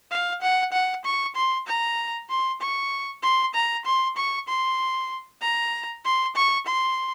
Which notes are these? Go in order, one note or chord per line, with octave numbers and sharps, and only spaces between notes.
F5
F#5
F#5
C#6
C6
A#5
C6
C#6
C6
A#5
C6
C#6
C6
A#5
C6
C#6
C6